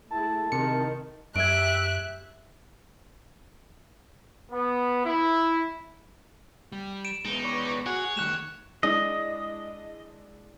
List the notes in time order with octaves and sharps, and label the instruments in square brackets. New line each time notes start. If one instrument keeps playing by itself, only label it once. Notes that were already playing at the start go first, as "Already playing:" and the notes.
[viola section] A3 E4 G#4 [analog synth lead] A5
[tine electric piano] C3 C#7 [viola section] D#3
[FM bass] F#2 [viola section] G4 E5 [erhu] F#6 [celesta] G#6 D7
[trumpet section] B3
E4
[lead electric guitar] G3
[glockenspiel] D7 E7
[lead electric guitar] G#3 B3 [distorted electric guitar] D#4
[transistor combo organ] B4 C#5 D5
[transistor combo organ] F#4 F#5 [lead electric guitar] G#4 [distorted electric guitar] C#5
[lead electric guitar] D#3 A3 [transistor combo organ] G3 [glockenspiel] F#6 E7
[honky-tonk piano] G#3 D4 E4 [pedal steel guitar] D#5